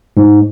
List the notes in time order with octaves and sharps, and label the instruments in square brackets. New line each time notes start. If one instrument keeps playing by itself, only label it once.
[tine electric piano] G#2